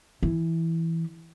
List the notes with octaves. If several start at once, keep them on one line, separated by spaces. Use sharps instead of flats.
E3